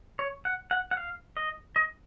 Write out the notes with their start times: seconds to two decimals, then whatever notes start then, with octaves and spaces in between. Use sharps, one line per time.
0.19 C#5
0.45 F#5
0.71 F#5
0.91 F#5
0.97 F5
1.37 D#5
1.76 D#5